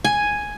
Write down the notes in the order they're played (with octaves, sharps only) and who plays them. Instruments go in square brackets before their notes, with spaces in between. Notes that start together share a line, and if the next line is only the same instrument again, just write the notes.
[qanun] G#5